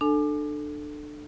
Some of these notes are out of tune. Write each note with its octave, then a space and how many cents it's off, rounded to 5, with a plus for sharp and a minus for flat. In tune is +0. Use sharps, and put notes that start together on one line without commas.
D4 +25 A4 +0 G#5 +25